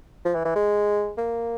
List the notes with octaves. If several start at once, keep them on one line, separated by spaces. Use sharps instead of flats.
F3
E3
E3
G#3
A#3